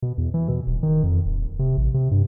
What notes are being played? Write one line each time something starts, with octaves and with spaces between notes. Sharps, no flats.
B2
E2
E3
B2
D#1
D#3
F2
D#1
C3
A1
C3
G2